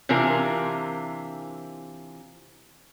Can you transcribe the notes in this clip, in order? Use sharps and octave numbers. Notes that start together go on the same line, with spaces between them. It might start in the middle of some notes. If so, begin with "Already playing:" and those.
C3 E3 D4 F4 A#4